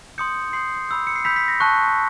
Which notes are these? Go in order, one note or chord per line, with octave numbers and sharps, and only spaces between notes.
C6 D#6 G6 C#7
C6 D#6 G6 C7
B5 E6 G6
C#7
C7
B5 E6 G6 B6
B6
A#6
A5 C#6 F#6